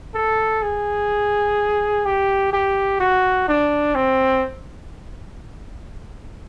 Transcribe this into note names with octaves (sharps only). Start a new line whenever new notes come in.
A4
G#4
G4
G4
F#4
D4
C4